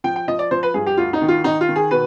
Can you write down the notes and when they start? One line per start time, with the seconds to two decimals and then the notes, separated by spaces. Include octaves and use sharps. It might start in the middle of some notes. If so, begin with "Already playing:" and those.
0.04 F3 G5
0.16 G5
0.28 F3 D#5
0.39 D5
0.51 F3 C5
0.63 B4
0.74 G2 G#4
0.86 G4
0.97 D2 F4
1.13 D#4
1.21 D#3
1.28 F4
1.44 D#3 D#4
1.61 F4
1.69 D#3
1.76 G#4
1.91 B2 B4